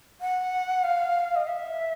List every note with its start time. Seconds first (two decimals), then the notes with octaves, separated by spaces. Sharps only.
0.21 F#5
0.84 F5
1.36 D#5
1.47 E5